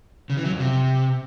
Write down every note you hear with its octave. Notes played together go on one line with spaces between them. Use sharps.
C#3
E3
F#3
F2
C3